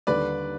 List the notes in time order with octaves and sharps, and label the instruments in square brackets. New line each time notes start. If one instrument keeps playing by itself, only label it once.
[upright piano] D#2 D3 G3 [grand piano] B4 D5